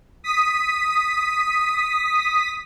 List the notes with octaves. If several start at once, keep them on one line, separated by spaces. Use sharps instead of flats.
D#6 B6